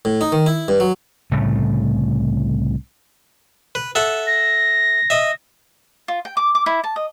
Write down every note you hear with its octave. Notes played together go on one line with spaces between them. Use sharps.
A2
D#4
D#3
E4
G2
F#3
C2 A2 C#3 A3
B4
A4 E5 F#5
A#6
D#5 E5
F4
G5
D6
D6
E4
A5
D#5